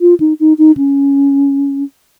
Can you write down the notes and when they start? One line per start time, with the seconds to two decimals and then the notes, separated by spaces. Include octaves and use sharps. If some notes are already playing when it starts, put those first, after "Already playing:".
0.01 F4
0.20 D#4
0.40 D#4
0.58 D#4
0.77 C#4